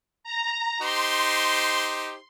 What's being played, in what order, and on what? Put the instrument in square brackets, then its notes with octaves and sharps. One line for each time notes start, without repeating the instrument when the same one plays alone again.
[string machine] A#5
[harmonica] D#4 G4 C5 [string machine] C6